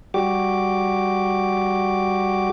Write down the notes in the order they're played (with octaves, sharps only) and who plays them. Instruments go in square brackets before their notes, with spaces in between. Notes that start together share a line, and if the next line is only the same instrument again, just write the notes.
[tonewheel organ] G3 F#4 G4 D6